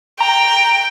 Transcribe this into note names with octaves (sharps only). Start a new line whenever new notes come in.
G5 A#5